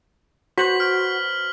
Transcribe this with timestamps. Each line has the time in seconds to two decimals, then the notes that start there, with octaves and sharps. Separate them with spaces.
0.58 F#4 B4 C5 B6 F#7
0.80 F6